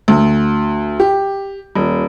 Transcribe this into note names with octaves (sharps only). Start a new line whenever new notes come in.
D2
G4
D#1